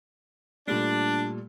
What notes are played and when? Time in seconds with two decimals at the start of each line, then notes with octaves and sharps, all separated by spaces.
0.68 A#2 G3 A3 D4